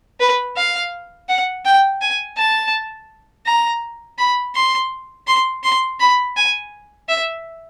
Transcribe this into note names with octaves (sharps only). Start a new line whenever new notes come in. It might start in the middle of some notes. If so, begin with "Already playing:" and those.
B4
F5
F#5
G5
G#5
A5
A#5
B5
C6
C6
C6
B5
G#5
E5